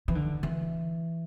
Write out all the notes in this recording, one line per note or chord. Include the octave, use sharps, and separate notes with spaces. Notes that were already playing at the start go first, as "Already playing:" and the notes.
E3
D3
E3